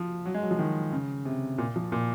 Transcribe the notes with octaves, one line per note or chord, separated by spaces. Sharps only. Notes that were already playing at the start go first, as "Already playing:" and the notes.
Already playing: F3
F#3
G#3
F#3
F3
D#3
C#3
C3
A#2
F3
A#2